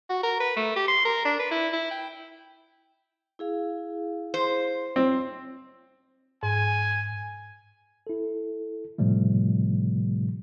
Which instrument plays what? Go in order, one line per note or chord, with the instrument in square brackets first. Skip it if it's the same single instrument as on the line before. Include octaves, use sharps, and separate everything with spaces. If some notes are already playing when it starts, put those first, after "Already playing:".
[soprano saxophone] F#4
A#4
B4
A3
G4
C6
A#4
D4
B4
E4
E4
G5
[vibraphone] E4 G#4 F5
[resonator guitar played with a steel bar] C5
[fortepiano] C4
[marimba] G#2 [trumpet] G#5
[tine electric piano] E4 A4
A2 C3 F3 G3 A3